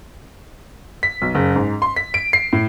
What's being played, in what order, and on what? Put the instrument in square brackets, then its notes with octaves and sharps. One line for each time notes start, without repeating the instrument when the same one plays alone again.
[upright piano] B6
B1
F#1
G#2
C6
B6
D7
C7
A2